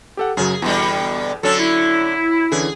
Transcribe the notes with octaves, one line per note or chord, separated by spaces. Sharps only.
G4 A4 F#5
F#2 C#3 F#3 G#4
E2 B2 D3 G3
D3 F#3 C#4 A4
E4
D3 E3 C#4 G#4